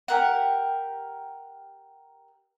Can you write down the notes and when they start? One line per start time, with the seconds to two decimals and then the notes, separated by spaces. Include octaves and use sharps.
0.08 G4 A#4 F#5